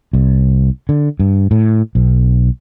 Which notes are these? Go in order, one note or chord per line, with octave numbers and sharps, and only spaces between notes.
C2
D3
G2
A2
B1